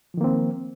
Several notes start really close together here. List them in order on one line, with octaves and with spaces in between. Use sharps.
F3 D#3 A#3 C4